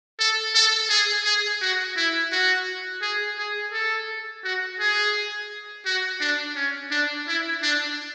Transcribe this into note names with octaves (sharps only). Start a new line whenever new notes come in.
A4
A4
G#4
G#4
F#4
E4
F#4
G#4
G#4
A4
F#4
G#4
F#4
D4
C#4
D4
E4
D4